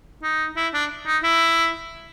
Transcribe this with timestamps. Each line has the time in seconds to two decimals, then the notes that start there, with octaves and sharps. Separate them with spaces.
0.23 D#4
0.56 E4
0.73 D4
1.06 D#4
1.23 E4